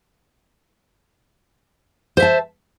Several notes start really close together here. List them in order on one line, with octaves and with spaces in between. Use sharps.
C5 E5 A5